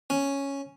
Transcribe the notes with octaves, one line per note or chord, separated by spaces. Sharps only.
C#4